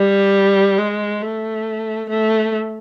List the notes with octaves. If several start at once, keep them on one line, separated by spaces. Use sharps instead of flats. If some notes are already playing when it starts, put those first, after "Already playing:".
Already playing: G3
G#3
A3
A3